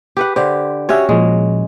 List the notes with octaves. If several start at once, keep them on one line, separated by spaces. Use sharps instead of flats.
G4 B4 F#5
D3 G4 C5
C#4 F#4 G4 C#5 E5 G5
A#2 F3 G#3